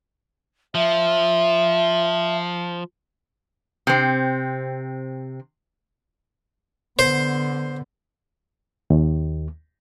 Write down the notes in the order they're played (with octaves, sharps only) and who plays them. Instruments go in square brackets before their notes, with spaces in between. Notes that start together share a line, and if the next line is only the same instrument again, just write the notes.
[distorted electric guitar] F3 [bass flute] E5
[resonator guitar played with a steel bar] C3 C4
[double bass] D3 B3 [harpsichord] C5
[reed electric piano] D#2